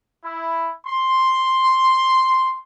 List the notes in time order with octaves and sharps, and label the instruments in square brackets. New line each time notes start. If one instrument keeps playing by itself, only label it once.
[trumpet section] E4
C6